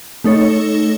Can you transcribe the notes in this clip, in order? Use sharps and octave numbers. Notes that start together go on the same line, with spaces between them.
A3 D#4 A4 C#5